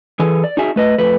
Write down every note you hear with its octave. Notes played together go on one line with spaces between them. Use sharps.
E3 G#4 A4
D5
D#4 F#4 G#4 E5
A3 B4 D#5
F2 A3 B4